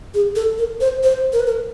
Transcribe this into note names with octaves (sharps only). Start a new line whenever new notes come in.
G#4
A4
A#4
C5
C5
A#4
B4
A#4